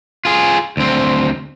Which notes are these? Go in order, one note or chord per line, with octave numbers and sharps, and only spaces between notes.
F4 G#4
D2 C4